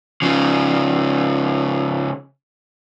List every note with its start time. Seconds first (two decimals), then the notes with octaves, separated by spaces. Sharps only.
0.22 C#3 F3